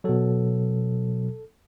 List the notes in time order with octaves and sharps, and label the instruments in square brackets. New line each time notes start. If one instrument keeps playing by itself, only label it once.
[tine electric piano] B2 F#3 A4